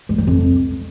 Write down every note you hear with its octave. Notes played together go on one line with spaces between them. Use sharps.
G#3
F#3
F2